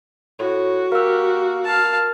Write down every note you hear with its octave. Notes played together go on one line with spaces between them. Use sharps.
A2 F#4
A#3 G4 A#4 E6
F5 A5